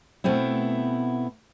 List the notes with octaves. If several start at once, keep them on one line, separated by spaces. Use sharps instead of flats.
B2 A3 B3 C4 E4